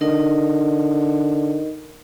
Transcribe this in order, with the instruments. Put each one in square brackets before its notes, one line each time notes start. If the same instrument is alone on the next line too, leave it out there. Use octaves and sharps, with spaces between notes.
[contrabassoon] D3 [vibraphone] D#4 A#4 D#5